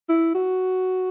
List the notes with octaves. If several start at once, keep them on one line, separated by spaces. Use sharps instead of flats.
E4
F#4